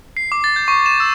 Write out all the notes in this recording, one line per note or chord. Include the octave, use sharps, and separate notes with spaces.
C7
D6
A6
G6
C#6
E7
E6